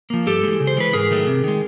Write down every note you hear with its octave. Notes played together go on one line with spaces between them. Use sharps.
F3 A#3
G2 G4 A4
E3 G#3
C#3
C5
E3 G#3 B4
G#2 G#4 A#4
D#3 F#3 A3
C3
D#3 G#3